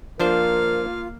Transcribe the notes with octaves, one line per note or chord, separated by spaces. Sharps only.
F3 A#3 D4 F4 A#4 C5 F5